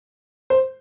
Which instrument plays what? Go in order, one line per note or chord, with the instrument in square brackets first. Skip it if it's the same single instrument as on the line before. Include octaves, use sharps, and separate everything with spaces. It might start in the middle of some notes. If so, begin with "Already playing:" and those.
[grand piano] C5